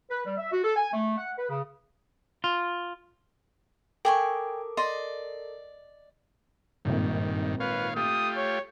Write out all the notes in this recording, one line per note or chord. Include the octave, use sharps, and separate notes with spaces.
B4
G3
E5
F#4
A4
G#5
A3
F#5
B4
C#3
F4
A4 A#4 G5 G#5 C#6 D6
D5 D#5 C6
G#1 G2 A#2 D#3 A4
F4 B4 C#5 F5
A3 F4 G4 D#6
C#5